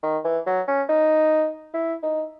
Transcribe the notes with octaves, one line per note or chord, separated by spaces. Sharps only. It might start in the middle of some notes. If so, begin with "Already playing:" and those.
D#3
E3
F#3
C#4
D#4
E4
D#4